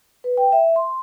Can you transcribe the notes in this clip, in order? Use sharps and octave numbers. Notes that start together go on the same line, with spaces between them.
B4
G5
E5
C6